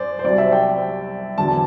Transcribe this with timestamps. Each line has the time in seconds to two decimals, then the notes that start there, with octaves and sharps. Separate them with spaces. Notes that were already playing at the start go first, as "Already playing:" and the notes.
Already playing: F#2 C5 D5
0.19 C5
0.24 C2 C3 F#3 D5
0.38 E5
0.52 G5
1.38 E2 D3 F#3 A5